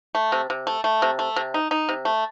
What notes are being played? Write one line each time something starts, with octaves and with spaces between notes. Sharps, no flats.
A3
C3
C3
A3
A3
C3
A3
C3
D#4
D#4
C3
A3